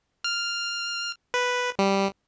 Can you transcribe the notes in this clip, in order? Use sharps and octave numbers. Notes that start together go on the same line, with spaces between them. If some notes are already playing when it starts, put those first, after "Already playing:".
F6
B4
G3